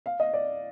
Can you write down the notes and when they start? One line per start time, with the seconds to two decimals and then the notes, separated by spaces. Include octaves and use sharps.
0.06 F5
0.20 D#5
0.34 D5